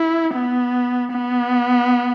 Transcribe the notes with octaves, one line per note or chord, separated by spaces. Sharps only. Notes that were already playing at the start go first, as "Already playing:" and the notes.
Already playing: E4
B3
B3